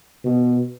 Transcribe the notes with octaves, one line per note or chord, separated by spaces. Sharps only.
B2